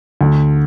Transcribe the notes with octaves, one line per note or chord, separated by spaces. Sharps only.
D2